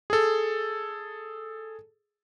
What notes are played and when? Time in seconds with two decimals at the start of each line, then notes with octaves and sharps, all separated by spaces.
0.10 G#4 A4